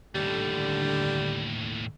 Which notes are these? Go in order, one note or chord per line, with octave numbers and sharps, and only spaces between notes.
D#2 A2 D3 G3